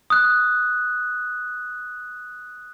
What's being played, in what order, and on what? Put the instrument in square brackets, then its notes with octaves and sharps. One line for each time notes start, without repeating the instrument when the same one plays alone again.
[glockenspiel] D#6 F#6